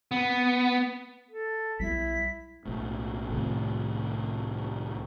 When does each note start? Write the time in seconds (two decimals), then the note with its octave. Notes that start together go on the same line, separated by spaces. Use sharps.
0.12 B3
1.30 A4
1.79 B1 G3 E4 B6
2.65 B1 A2
3.30 C2 A2 D#3